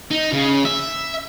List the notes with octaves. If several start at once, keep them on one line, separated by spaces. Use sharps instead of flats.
D#4
C#3
E5